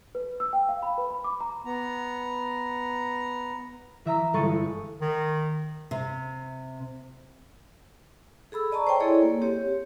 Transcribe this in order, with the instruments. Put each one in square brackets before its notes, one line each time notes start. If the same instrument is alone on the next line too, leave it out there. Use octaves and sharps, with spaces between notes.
[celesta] B4
E6
G5
F5
B5
B4
B5
D6
A#5
[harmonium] B3 A#5
[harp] E3 E5 A#5 E6
G1 G#3 A4 C#6 A6 D#7
[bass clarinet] D#3
[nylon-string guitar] C3
[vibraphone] G#4 A4 B5 E6
D5 D#5 A5 A#5 C#6
C5 C#5 D#5 G5 G#5 C6
E4 G#4 A4 C#5 D5
A#3
C4 G4 C#5